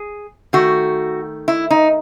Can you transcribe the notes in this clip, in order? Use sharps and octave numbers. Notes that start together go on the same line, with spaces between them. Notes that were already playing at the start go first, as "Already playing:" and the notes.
Already playing: G#4
D#3 A3 F#4
E4
D#4